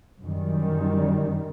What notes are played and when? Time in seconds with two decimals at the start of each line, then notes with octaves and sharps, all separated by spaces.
0.23 F#2 D#3 G3